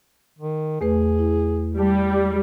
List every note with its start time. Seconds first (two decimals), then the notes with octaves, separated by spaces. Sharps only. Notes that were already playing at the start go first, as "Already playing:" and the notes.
0.39 D#3
0.81 E2 A3 G#4 B4
1.19 E4
1.78 G3 G4 A5